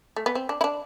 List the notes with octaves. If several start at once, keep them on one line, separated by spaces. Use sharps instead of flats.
A3
B3
C4
D4
E4
D4